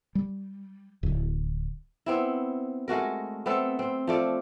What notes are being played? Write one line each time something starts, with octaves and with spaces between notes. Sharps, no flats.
G3
D1
B3 C4 E4
G#3 A3 F#4 A#4
B3 C4 A4 E5
C4
F3 A3 D5